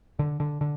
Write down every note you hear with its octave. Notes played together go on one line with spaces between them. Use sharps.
D3
D3
D3